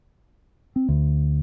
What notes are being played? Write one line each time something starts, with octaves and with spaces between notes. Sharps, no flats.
C4
D2